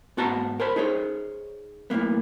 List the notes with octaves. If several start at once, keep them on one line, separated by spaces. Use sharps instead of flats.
G#2 B3 F#4 A5 A#5
A#4 C5 C#5 A5 B5
D#4 G#4 C5 C#5
B1 A2 C#3 A#3 B3